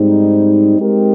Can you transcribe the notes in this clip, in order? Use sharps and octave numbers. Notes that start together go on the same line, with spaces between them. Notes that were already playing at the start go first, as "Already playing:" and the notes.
Already playing: G#2 G3 C4 D#4
G#3 C4 D#4 G4 A#4